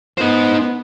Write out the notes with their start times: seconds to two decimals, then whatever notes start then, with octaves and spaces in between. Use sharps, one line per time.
0.18 B3 D#4 C5